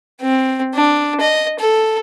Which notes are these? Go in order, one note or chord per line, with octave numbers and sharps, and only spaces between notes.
C4
D4
D#5
A4